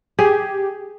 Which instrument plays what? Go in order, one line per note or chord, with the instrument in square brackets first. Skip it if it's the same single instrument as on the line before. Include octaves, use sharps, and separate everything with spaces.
[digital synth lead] G4 [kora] G#4